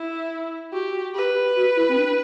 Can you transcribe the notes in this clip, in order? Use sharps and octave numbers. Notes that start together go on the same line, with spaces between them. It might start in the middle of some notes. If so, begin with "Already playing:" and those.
Already playing: E4
F#4 G4
F#4
G4 B4
G4
F#4
E4
C4
D4